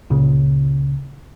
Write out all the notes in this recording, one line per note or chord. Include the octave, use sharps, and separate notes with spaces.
C#2 A#2 C#3